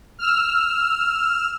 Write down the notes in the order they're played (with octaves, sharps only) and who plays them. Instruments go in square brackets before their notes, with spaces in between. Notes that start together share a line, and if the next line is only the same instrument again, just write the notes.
[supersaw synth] E6 F6